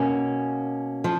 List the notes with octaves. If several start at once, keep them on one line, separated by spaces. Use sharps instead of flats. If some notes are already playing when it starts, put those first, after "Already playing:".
Already playing: B2 A#3 C#4
F3